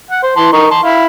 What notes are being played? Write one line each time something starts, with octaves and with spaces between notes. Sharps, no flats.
F#5
C5
E3 A5 C6
D#4 A#4 C#6
A5 C6
E4 F5